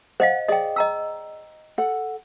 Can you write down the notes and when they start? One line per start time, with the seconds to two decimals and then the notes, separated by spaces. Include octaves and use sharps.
0.20 C5 D#5 F5 F#5
0.48 G#4 D5 D#5 G5
0.76 D#5 A#5 E6
1.78 A4 F#5